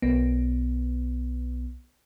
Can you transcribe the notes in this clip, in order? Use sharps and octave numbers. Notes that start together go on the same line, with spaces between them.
B1 B3